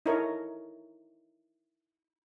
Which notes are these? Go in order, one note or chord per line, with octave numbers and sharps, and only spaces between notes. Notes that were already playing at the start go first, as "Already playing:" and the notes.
D#4 E4 A4 A#4 C#5 D#5